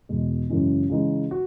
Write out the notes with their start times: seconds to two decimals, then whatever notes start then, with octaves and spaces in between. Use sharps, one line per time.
0.09 E2 B2 G#3
0.50 F#2 C#3 E3 G#3 C#4
0.90 C#3 E3 G#3 D#4 G#4
1.31 F#4